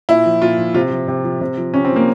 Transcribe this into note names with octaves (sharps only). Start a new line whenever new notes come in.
A#2 E4
F3
A#2 F4
F3
C3 F4
F3
C3
F3
C3
F3
C3 C#4
C4
F3
A#3